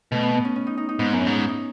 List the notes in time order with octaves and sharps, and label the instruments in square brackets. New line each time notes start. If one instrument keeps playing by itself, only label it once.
[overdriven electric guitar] B2 [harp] A3
[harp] B3
B3
C#4
C#4
D#4
D#4
D#4
[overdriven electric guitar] G#2 [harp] B3
[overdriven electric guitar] F#2 [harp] B3
[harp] C#4
[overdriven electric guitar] G#2
[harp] D#4
E4
D#4